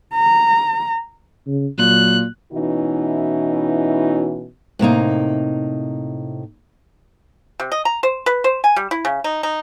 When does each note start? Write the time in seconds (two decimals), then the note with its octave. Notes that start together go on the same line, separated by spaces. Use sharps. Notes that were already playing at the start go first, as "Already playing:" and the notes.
0.15 A#5
1.47 C#3
1.78 A#2 F#3 F#6
2.53 B2 E3 C#4 D#4 E4 F#4
4.79 A2 C3 A#3 D#4
7.60 C3
7.72 D#5
7.85 A#5
8.03 C5
8.26 B4
8.44 C5
8.64 G#5
8.76 G3
8.91 E4
9.05 C#3
9.24 D#4
9.43 D#4